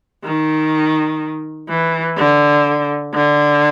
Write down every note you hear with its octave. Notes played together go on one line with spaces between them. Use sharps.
D#3
E3
D3
D3